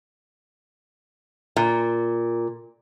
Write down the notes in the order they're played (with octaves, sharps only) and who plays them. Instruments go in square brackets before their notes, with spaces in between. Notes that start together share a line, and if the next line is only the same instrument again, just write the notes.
[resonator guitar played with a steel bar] A#2